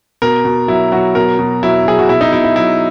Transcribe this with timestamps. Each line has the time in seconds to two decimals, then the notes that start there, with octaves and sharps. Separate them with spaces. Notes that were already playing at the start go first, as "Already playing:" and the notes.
0.22 B2 A#4
0.45 B2
0.68 F#3 E4
0.92 F#3 F#4
1.15 B2 A#4
1.39 B2
1.63 F#3 E4
1.86 F#3 G#4
1.99 F#4
2.09 B2 E4
2.21 D#4
2.32 B2 E4
2.44 E4
2.56 F#3 E4